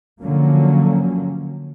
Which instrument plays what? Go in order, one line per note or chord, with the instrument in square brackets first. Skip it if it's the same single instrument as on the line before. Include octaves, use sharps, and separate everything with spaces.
[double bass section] D3 F3 F#3 A#3 C#4